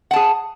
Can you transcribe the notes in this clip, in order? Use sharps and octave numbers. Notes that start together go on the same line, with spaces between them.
G#4 F#5 A5